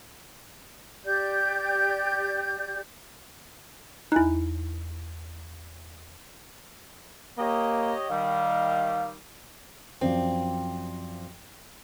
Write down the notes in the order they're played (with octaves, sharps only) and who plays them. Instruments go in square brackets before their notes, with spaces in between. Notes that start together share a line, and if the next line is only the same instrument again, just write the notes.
[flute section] G4 D5 G6
[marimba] E2 G#5 F#6 [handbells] D#4 E4
[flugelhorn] A#3 [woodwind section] G4 C#5 D#5
[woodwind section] D#3 G3 [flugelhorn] F5
[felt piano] F#2 F3 D5 [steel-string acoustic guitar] C4